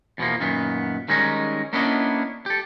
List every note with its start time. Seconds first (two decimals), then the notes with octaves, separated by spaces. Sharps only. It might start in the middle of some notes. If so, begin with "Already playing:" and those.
0.18 E2 B2 F3 A#3
0.40 F#2 A#2 D#3 B3
1.08 D#3 G3 G#3 C#4 D#4 A#4
1.73 A#3 B3 C#4 D4 E4 D#5
2.46 G4 A4